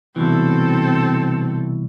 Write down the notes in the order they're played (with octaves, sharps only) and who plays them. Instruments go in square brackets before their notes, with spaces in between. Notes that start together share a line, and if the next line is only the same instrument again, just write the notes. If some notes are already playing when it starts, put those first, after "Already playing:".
[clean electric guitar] C2 B2 E3 [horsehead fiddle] C4 A4